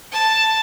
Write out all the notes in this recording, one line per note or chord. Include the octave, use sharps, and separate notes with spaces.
A5